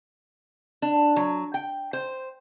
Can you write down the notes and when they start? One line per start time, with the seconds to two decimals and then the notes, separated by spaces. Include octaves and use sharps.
0.82 D4
1.16 F#3
1.54 G5
1.93 C5